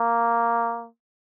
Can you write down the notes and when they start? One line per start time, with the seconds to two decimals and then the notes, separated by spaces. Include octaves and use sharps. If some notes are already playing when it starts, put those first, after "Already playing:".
Already playing: A#3